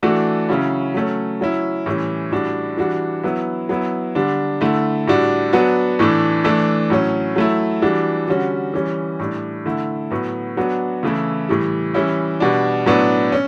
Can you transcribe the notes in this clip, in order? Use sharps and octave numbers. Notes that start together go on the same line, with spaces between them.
E3 A3 D4 F#4
C#3 F#3 C#4 E4
F#3 A3 C#4
F#3 C#4 E4
A2 E3 G3 C#4 E4
A2 G3 D4 F#4
E3 G3 D4 F#4
F#3 B3 E4
F#3 B3 E4
D3 G3 D4
D3 A3 E4
A2 G3 D4 F#4
F#3 B3 D4 F#4
A2 E3 A3 D4
E3 A3 D4
A2 F#3 C#4
F#3 A3 E4
E3 G3 D4 F#4
D3 G3 C#4 F#4
E3 G3 C#4
A2 G3 D4
D3 A3 E4
A2 F#3 B3 F#4
F#3 B3 D4 F#4
C#3 E3 A3 E4
A2 E3 G3
E3 G3 C#4 E4
B2 G3 D4
A2 F#3 B3 D4
C#4